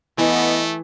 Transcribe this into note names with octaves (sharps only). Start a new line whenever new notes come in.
E3 A3 B3 D#5